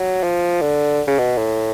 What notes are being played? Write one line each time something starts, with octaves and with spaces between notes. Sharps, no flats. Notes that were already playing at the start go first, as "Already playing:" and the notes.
Already playing: F#3
F3
D3
C#3
B2
A2